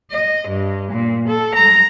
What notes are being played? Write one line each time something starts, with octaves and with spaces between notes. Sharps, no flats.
D#5
G2
A#2
A4
A#5